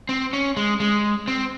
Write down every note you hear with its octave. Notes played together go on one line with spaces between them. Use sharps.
C4
C#4
G#3
G#3
C4